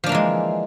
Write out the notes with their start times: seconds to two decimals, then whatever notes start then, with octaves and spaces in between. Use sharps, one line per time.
0.04 F3
0.06 D4
0.09 A#3
0.12 E3
0.15 G#3